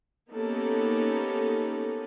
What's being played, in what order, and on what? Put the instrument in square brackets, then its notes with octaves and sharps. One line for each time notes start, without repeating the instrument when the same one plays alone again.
[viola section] A#3 B3 C#4 D#4 G4 A4